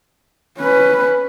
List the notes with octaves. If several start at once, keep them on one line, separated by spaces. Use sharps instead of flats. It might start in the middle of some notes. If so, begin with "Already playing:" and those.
C#4 B4